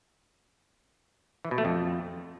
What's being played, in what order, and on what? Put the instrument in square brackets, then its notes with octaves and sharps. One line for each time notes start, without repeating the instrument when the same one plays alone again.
[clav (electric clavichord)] E3
B2
A3
F2